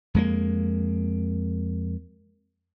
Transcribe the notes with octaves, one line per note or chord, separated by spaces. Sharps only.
F2 G#3 A#3